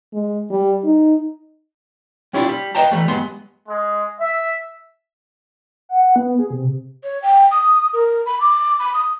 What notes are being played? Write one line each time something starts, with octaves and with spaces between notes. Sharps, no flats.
G#3
G3
D#4
G3 C#4 E4 F4 D5
G3
B4 D#5 F5 G5 A5 A#5
E3 F#3 G3 A3
G2 F#3 G#3 B3 B5 C6
G#3
E5
F#5
F#5
B3
G#4
C3
C#5
G5
D#6
A#4
B5
D6
B5
D#6